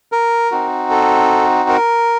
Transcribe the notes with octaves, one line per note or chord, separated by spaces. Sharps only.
A#4
C4 D#4 F#4
A4
A#4